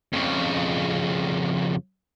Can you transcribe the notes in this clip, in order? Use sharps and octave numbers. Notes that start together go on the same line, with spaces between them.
F2 C#3